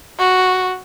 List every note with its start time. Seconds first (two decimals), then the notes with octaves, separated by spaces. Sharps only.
0.19 F#4